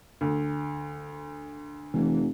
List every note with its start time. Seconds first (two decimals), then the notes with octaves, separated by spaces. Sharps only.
0.21 D2
1.94 F1 E3